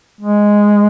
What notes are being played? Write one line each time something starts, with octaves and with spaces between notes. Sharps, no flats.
G#3